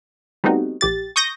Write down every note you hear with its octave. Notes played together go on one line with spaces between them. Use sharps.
G3 A3 B3 C4 D#4 F#4
A#1 G4 A6
C#6 D#6 G6 A#6